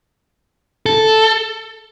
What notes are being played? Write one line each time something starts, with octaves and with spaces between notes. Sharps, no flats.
A4